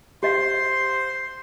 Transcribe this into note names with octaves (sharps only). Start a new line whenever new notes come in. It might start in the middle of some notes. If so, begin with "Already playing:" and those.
G4 C5 D#5 F5 C6